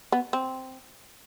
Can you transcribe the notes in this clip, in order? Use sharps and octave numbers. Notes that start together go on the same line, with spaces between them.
B3
C4